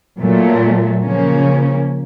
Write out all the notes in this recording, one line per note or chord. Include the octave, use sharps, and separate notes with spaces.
A#2 F#3 A3
C#3 F3 A#3 C#4